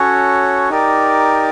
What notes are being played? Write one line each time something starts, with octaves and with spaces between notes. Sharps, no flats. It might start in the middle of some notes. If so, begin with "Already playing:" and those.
Already playing: C#4 F#4 A4 C#5
D#4 G4 A#4 D5